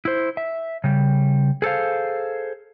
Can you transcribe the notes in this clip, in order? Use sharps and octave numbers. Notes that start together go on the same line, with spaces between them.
E4 C5
E5
C#3 G3
G#4 A4 C5 F5